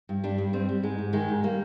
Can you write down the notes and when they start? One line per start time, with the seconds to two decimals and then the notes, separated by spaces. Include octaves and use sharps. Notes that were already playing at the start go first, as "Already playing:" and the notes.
0.09 G2
0.24 G3 D4
0.38 G2
0.53 G3 C4
0.69 G3
0.83 G#2 G#3
0.98 G#2
1.13 D#3 G#3
1.29 G#2
1.43 G3 A#3